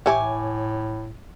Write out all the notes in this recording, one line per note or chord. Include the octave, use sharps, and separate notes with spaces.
A2 E3 E4 G4 C#5 G#5 D6